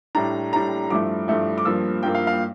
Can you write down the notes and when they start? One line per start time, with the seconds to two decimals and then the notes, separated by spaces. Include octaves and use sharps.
0.15 A2 G3 D4 A#5
0.52 A2 G3 D4 A#5
0.90 G2 F3 A3 E4 D6
1.28 G2 F3 A3 E4
1.58 D6
1.65 G2 F3 A#3 E6
2.03 G2 F3 A#3 G5
2.15 F5
2.27 F5